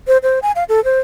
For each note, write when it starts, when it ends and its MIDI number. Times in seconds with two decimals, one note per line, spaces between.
0.07 0.17 72
0.23 0.39 72
0.42 0.52 80
0.56 0.64 77
0.69 0.83 69
0.84 1.00 72